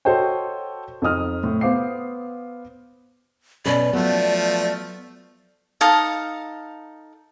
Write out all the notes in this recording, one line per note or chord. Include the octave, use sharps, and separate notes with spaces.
F#4 A4 C5 C#5 D#5 G5
F2 D#4 D#5 D#6 F6
A2
B3 C5 F5 D6 C7
B2 C#4 B4 D5
F3 F#3 A3 B3
D#4 A4 F5 D#6